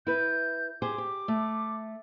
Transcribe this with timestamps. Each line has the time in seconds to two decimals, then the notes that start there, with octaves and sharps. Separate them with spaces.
0.07 E4 B4 G6
0.82 G4 G#4 C5 D6
0.98 G4
1.28 A3